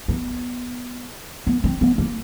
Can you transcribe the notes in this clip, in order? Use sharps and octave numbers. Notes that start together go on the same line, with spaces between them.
B3
B3
C4
B3
A#3